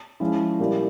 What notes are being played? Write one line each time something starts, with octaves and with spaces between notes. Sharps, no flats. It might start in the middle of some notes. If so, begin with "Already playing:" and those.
F3 G#3 C#4 E4
A#2 G3 A#3 E4 G4